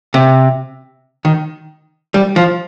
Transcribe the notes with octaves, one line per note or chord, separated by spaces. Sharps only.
C3
D#3
G3
F3